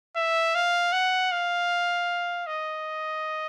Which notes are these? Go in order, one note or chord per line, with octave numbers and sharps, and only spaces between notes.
E5
F5
F#5
F5
D#5